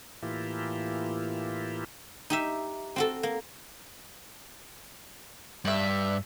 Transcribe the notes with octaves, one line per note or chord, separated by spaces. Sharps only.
A2 E3 A#3 E4 F4 G4
D#4 G4 E5
C4 F#4 A4
A#3
G2 D5 E5